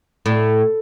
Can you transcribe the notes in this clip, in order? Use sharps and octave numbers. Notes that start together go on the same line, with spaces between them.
A2